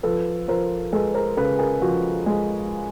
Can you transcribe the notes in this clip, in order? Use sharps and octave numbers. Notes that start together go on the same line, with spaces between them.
F3 A4 B4
F3 A#4 C5
G#3 A4 B4
A#4 C5
C#3 A4 B4
G#4 A#4
F3 F#4
G#3